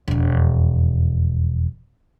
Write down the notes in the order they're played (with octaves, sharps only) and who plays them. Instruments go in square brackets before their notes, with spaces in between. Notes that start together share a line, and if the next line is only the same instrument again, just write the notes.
[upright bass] E1 F2